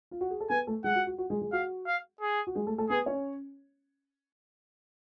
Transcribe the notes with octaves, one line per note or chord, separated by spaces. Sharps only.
F4
F#4
G#4
A4
B3 B4 G#5
A3 A4
G#3 G#4 F#5
F#4
F#4
F#4
G#3 G#4
G#3 G#4
F#4 F5
F5
G#4
F#4
G#3 G#4
A3 A4
A3 A4
B3 G#4 B4
C#4 C#5